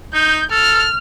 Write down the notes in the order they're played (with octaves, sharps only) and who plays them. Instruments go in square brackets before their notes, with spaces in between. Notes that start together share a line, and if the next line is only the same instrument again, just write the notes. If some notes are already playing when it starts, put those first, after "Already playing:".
[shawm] D#4 [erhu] G6
[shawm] A4 [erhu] F6